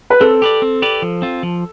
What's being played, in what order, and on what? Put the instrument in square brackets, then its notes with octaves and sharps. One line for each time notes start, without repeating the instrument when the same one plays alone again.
[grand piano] B4
[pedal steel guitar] C4 [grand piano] A4
[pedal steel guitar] G4 B4 D5
C4
G4 B4 D5
F3
C4 F4
F3